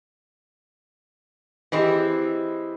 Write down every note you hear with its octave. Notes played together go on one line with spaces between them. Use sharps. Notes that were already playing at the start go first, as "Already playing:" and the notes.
E3 C4 E4 G4 G#4 D#5